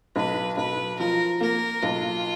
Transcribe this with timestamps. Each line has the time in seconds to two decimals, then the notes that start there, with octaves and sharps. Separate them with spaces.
0.16 B1 B4
0.57 B1 B4
0.99 F3 A#4
1.41 A#3 A#4
1.83 B1 F4